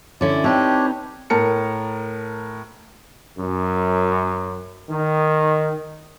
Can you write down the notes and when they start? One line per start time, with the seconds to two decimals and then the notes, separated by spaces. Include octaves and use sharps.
0.21 D3 C#4 E4 D5
0.44 C4 D4 D#4 G4 B4 C#5
1.30 A2 A#4 A5 C#7
3.38 F#2
4.90 D#3